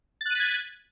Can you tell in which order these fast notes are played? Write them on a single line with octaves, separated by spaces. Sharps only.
A6 F#6 D#7 B6 G#6